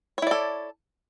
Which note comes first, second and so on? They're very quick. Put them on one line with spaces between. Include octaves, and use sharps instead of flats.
C#5 E4 D5 A4